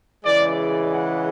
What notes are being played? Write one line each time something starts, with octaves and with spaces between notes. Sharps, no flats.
C#3 E3 G#3 D5
F#5